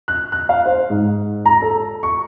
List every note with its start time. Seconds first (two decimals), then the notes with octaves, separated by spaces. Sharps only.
0.08 F#6
0.32 F#6
0.49 F5
0.66 C5
0.90 G#2
1.46 A#5
1.62 A4
2.03 C#6